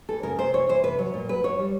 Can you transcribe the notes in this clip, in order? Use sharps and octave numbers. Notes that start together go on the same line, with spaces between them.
E3 A4
C#3 A#4
C3 C5
E3 C#5
E3 C5
C3 B4
F#3 C#5
A#2
F#3 B4
F#3 C#5
G3